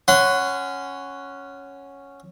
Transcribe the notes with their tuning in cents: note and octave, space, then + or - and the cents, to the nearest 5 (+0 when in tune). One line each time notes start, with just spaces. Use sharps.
C#4 +0 F#5 +0 C6 -40